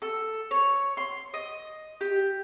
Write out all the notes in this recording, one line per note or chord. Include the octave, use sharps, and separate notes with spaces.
A4
C#5
C6
D#5
G4